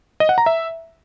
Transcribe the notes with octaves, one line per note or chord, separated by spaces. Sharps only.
D#5
F#5
A#5
E5